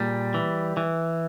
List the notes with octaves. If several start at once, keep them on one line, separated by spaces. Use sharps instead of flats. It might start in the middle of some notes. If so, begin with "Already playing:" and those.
Already playing: A#2 G3 G#4
E3
E3